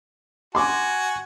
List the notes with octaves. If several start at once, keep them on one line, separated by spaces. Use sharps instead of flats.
F#4 G#5 C6 D6